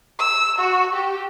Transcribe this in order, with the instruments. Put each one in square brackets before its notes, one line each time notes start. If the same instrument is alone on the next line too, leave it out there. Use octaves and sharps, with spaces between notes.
[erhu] E6
F#4
G4